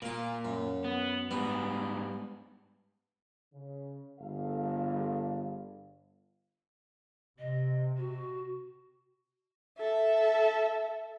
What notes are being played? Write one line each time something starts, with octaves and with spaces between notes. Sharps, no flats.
A#2 A#3 F4
F#2
B3
G#2 G3 B3
C#3
G1 G#4 A4 F5
C3 D#5
F#4
A4 E5